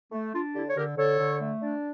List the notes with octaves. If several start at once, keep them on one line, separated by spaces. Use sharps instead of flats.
A3
D4 F4
D3 E4 G4
C#5
D3 G4 A#4
D3 A4 C#5
D3
A3
D4